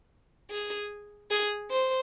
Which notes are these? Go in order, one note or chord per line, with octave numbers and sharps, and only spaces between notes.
G#4
G#4
C5